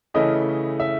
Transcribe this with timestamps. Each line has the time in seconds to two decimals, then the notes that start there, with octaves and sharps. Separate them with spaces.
0.14 C#3 E3 A3 C#4 E4 D#5
0.80 E5